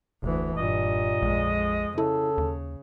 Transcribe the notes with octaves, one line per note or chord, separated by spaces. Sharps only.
F1 D2 E3
G2 A#2 D#5
A#1 F2 G#3
C#3 E4 A4
D#2